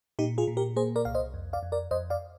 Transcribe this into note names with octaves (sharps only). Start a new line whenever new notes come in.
A#2 D#4 G4
F4 G#4
A#2
G4 A#4
A#3 G#4 C5
A#4 D5
C2 F5
C5 D#5
F2
D5 F5
F2
A#4 D5
F2 C5 D#5
D5 F5